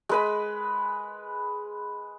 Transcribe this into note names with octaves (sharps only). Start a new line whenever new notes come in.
G#3 B4 B5